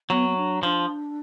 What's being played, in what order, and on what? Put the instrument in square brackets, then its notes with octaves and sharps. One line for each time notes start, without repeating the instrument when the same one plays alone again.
[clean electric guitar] F#3 [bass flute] B3
[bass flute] B3
D4
[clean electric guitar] F3 [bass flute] D4